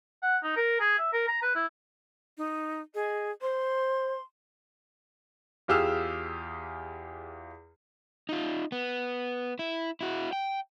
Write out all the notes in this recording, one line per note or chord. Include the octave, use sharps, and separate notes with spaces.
F#5
D#4
A#4
G#4
E5
A#4
A#5
B4
E4
D#4
G#4 D#5
C5 C6
E2 F4 G4 G#4 E6 F6
D#4 F4
B3
E4
E4 F#4
G5